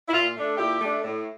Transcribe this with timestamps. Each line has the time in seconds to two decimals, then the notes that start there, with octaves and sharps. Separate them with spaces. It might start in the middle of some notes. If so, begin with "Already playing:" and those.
0.08 E4
0.12 A#2 F4
0.35 A3 D4
0.57 A#2 E4 G4
0.80 A3 D4
1.03 A2